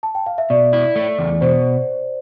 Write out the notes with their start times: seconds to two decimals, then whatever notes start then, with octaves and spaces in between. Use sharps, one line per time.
0.03 A5
0.15 G5
0.26 F5
0.38 E5
0.50 B2 D5
0.73 E4
0.96 A3
1.19 E2
1.41 B2 C5